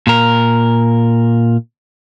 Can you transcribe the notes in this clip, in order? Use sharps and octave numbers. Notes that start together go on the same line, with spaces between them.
A#2 A#4